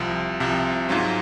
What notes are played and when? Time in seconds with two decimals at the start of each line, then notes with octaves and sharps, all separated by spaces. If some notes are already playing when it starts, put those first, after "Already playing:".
Already playing: C2 C3 F3
0.40 C2 C3 F3
0.89 G#2 F#3 C#4 F4